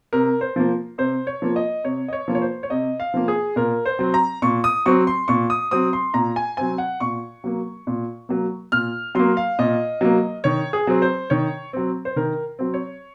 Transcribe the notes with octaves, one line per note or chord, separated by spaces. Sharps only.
C3 A#4
C5
F3 A#3
C3 C5
C#5
F3 A#3
D#5
C3 C#5
D#5
C#5
F3 A#3
C#5
C5
C#5
C3 D#5
F5
F3 A#3
G#4
A#2 A#4
C5
F#3 C4
A#5
A#2 C#6
D#6
F#3 C4 C#6
C6
A#2 C#6
D#6
F#3 C4 D#6
C6
A#2 A#5
G#5
F#3 C4 G#5
F#5
A#2 C#6
F#3 A#3
A#2
F#3 A#3
A#2 F6
F#3 A#3 C6
F5
A#2 D#5
F#3 A#3
D#3 C#5
G#4
F#3 C4
C5
D#3 C#5
F#3 C4
C5
D#3 A#4
F#3 C4
C#5